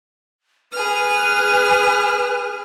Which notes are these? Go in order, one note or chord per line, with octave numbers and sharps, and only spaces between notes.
G#4 B4 F6